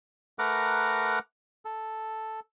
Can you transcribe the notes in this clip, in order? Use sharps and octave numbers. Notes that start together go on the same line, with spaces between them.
A3 A#4 B4 F#5 A#5 D6
A4